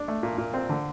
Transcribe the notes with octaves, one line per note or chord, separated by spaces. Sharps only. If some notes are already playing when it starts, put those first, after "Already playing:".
Already playing: D4
A3
A#2
A#2
C4
D3